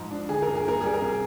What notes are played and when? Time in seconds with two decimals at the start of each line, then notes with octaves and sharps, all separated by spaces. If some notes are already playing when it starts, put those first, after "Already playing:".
Already playing: G#2 F3
0.11 D4
0.29 D3 G#4
0.42 G2 A#4
0.55 G#4
0.65 A#3 A#4
0.81 G3 G#4
0.94 A#4
1.01 C3 G#4